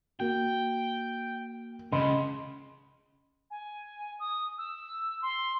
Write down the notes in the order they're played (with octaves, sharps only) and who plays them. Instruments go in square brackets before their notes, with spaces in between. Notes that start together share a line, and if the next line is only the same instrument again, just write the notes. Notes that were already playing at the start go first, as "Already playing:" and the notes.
[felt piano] A#3 F#4 [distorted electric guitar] G5
[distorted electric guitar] C#2 C#3 [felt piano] D#5 B5 C6
[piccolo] G#5
D#6
E6
C6